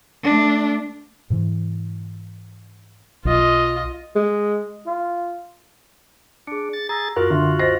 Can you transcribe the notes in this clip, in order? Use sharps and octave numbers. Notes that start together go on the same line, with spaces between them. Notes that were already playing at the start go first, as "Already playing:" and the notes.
A3 D4
G#2 C3 E3
B1 F4 D#5
G#3
F4
D4 G#4 C#7
A6
G#4 A#5 E6 A6 A#6
F#2 F4 F#4 A#4
D3 E5 C6
C5 D#5 A6 A#6